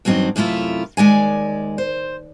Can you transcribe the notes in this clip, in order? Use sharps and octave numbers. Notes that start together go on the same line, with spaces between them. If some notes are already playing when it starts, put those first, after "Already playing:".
E2 G2 F#3 C4 D#4 D#5
F#2 C3 A3 E4 F4
D#2 G#3 D5 G#5
C5